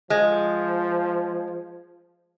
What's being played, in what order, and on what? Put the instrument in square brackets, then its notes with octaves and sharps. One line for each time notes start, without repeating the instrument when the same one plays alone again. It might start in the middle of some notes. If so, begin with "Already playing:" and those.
[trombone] F3 [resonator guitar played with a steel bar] G#3